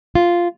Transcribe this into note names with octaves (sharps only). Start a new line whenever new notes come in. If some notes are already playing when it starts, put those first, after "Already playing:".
F4